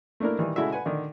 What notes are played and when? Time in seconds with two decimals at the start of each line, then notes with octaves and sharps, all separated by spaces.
0.20 A3 A#3 D4 E4 A#4
0.39 D#3 E3 G3
0.56 C#3 G#3 E4 F#4 A4 E5
0.72 B4 F#5 G#5
0.86 D3 D#3